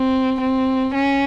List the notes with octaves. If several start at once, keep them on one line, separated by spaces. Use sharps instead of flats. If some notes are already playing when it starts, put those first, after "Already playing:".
Already playing: C4
C4
C#4